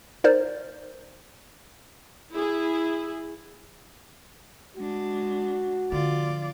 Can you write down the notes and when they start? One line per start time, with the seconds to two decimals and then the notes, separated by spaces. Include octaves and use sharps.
0.24 D#4 A#4 C5 D5
2.32 E4 G#4
4.77 G#3 D4 F#4
5.92 D3 F3 F4 D5